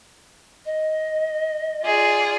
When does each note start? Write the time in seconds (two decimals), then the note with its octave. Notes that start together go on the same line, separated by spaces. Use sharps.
0.65 D#5
1.84 F4 G#4 D5